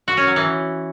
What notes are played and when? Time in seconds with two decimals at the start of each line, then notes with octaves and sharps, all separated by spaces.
0.08 F#4
0.17 C#4
0.27 F#3
0.36 E3